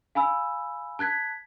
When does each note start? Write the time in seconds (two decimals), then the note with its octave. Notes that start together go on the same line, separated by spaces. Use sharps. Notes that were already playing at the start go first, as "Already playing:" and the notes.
0.15 F5 G#5 B5 E6
0.99 A5 F#6 G#6 B6